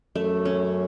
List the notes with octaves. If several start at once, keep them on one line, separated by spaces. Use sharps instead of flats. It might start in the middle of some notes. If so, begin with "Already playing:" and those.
F#2 A3
C#4